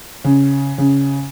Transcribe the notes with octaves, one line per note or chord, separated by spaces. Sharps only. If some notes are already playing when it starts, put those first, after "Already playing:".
C#3
C#3